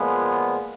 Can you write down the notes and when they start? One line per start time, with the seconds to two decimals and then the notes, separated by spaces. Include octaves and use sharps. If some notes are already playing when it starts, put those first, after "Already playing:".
Already playing: A#2 F3 G#3 B3